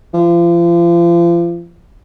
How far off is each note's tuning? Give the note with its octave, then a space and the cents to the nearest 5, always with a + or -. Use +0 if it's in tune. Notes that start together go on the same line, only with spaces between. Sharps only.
F3 -35